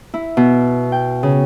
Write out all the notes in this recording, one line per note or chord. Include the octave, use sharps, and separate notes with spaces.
E4
B2
G5
C#3